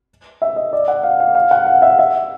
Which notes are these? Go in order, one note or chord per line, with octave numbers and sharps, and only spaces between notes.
E5
D#5
D5
F#5
F5
F5
F5
F#5
F5
E5
F5
E5